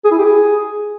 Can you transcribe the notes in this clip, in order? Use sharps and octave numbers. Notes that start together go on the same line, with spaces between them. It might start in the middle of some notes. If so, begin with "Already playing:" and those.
G#4
E4
G4
G#4